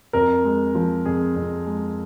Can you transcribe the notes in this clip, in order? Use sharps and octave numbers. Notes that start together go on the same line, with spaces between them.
F2 A#4
G#3
F3
F2 G#4
F2
G#3